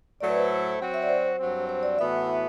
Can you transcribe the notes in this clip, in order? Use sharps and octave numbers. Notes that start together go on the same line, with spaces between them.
A2 F#3 A3 E4 A4 D5
B4
C5
F#3 C4 F#4
E5
D5
C5
G2 F#3 C4
C5
D5
A2 E3 B3 F#4 E5